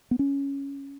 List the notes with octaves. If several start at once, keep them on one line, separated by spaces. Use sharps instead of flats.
B3
C#4